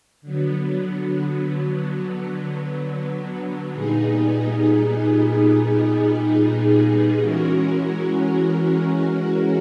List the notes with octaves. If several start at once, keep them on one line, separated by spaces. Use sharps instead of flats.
D3 F#3 B3
A#2 G3 B3 D#4 G#4
E3 G#3 C#4 F#4 A#4